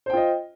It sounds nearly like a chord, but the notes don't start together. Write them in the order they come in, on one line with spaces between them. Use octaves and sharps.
C5 G5 F4 D#5